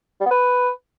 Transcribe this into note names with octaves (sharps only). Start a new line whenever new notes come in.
G3
B3
B4